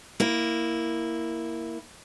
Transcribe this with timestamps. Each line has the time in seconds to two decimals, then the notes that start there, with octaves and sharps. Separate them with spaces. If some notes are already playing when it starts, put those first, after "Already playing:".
0.20 A#3 E4